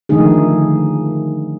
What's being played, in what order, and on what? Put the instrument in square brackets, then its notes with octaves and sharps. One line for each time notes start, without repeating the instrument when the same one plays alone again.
[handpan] D3 D#3 F3 A3 D#4 G#4